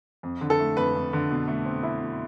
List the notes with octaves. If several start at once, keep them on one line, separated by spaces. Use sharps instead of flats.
F2
D3
A4
A3
F2 B4
F2
D3
B2
A3
C4
E4
B2